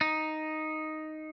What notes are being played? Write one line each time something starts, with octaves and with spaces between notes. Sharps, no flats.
D#4